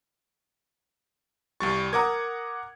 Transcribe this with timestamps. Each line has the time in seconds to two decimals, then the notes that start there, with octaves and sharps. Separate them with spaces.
1.60 C2 G3 C#6 A6
1.93 A#4 F#5 A#5 D6 D#6 G#6